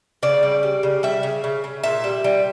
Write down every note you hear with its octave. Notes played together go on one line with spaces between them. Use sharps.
C#3 D5
G3
G3
C#3
G3 E5
C#3
C#3
C#3
A#2 E5
G3
G3